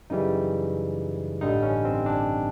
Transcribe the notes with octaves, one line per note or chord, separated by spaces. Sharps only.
F#2 C#3 E3 G3 D#4
A1 G2 D3 G3 D#4
C#4
C4
D4